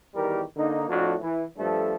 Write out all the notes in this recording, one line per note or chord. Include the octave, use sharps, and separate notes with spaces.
E2 D#3 G3 G4 A#4
D3 A#3 D#4
F2 A2 D4 F#4
E3
G2 F3 G3 A3 A4